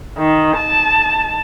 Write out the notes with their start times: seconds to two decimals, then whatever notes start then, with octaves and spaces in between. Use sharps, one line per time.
0.18 D#3
0.56 A5